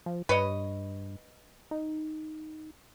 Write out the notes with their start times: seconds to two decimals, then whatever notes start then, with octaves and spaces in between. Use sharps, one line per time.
0.06 F3
0.29 G2 B4 C#5 D#5
1.71 D#4